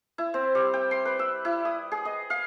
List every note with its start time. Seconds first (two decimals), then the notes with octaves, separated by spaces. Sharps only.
0.18 E4
0.34 C4
0.55 G3
0.74 G5
0.91 C6
1.05 B4
1.19 E6
1.45 E4
1.65 D#6
1.92 G#4
2.05 D#5
2.30 F5